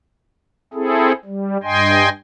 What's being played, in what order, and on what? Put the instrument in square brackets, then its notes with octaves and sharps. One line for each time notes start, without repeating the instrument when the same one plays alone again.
[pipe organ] C4 E4 G#4 A4
G3
G2 D#5 G5 G#5 C6